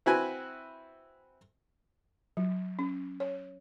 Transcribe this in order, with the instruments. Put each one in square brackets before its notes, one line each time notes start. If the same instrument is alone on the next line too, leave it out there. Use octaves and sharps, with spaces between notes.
[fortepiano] C4 E4 F#4 B4 G#5
[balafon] F#3
C#4
C#5